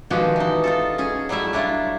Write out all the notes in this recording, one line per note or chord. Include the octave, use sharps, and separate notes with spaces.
B2 D#3 F3 G#3 F#4 G4
E3 D#4
D#4 F4 A4
C#4 G#4
F#3 G3 A3 E4 E5
F#3 D4 E4 F4